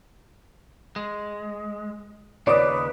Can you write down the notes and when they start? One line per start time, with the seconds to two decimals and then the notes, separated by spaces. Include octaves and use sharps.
0.96 G#3
2.47 D#2 C#3 B4 C#5 D5 D6 D#6